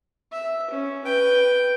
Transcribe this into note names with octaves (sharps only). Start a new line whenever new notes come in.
E5
C#4
B4 G5